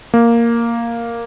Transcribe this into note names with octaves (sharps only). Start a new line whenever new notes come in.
A#3